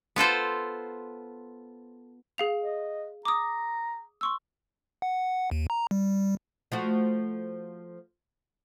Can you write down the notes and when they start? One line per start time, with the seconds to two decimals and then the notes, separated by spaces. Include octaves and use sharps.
0.16 B3 F4 A4 C5
2.38 G#4 F5 F7
2.61 D#5
3.25 A#5 D6 D#6
4.21 C6 C#6 E6
5.02 F#5
5.51 D#2
5.70 A#5
5.91 G3
6.72 F3 A3 F#4